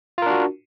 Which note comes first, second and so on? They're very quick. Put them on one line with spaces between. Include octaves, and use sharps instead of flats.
F4 A#4 D4 F#4